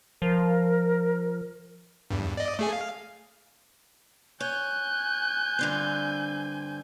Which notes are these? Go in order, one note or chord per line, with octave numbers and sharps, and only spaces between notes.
F3 A#4
E2 G2
D5 D#5
A3 G#4 G#5
F5
C#5 G#5 F#6 G6
G2 D3 C4